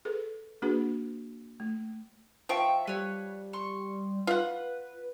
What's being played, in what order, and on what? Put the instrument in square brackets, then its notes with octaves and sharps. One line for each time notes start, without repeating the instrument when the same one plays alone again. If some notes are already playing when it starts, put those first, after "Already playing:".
[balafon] G#4 A4 B4
A#3 D4 F#4 G#4 B4
A3
[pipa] F3 [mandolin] E5 G5 C#6
[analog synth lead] G3 [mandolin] B4 C#5
[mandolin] C6 C#6
[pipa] F4 F#5 [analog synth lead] B4